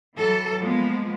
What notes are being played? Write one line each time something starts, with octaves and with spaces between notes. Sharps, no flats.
E3 F#3 A4
F3 G#3 A#3 B3